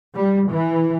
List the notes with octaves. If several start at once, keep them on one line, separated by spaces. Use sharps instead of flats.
G3
E3